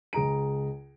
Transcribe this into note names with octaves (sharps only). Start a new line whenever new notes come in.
C#2 G#4 A#5 D7